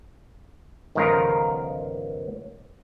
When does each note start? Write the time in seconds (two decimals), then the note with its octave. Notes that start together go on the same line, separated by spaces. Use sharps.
0.95 G1 C#2 D#3 F3 F4 A#4